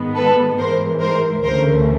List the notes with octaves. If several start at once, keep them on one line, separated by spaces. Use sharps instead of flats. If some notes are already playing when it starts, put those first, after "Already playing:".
Already playing: G#2 D#3 G#3 B3
A4 B4
G#2 E3 G#3 A#4 C5
A#4 C5
D2 C#3 E3 A3 A#4 C5